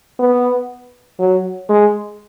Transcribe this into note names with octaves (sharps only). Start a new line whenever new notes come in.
B3
F#3
G#3